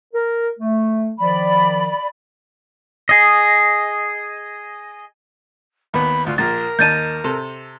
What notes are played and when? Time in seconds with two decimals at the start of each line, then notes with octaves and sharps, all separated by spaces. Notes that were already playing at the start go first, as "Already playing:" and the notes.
0.13 A#4
0.59 A3
1.19 D#3 F3 D5 B5
3.09 G#4 D#5
5.94 D#2 B3 B5
6.26 D2 F4
6.38 A#1 A#2 A#4 A6
6.79 D#2 D#4 A5 G6 A6 D#7
7.24 C3 A4